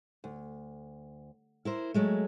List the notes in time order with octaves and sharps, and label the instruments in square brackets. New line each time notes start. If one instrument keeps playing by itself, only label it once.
[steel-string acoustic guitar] D2
E4 A#4 C5
F#3 G#3 A3